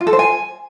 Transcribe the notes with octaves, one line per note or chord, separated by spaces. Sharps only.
F4
A4
C5
G#5